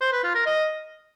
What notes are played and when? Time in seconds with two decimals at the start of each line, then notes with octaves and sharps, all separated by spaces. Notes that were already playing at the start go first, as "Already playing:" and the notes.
0.01 C5
0.12 B4
0.23 F4
0.34 A#4
0.46 D#5